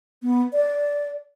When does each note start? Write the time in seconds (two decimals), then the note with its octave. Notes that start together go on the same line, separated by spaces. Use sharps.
0.22 B3
0.53 D5